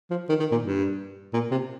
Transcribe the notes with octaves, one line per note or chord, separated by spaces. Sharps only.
F3
D#3
D#3
A#2
G2
A#2
C3